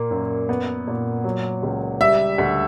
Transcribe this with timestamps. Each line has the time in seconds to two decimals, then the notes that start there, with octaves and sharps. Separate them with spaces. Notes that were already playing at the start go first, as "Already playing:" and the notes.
Already playing: A#2 A#3
0.11 F#2
0.49 B3
0.87 A#2
1.24 F#3
1.63 C#2
2.00 G3 E5
2.38 D2